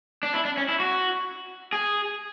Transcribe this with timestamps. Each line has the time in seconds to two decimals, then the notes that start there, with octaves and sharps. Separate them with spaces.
0.23 D4
0.34 E4
0.45 D4
0.57 C#4
0.69 E4
0.80 F#4
1.73 G#4